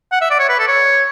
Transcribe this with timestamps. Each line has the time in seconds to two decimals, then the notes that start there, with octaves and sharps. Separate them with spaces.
0.12 F#5
0.21 E5
0.31 D5
0.39 C#5
0.49 B4
0.59 A4
0.68 C#5